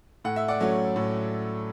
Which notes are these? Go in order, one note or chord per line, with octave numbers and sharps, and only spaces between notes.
A2 F#5
E5
D5 F#5
F#3 A3 C#4
A2